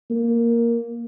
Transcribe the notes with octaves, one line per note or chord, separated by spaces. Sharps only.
A#3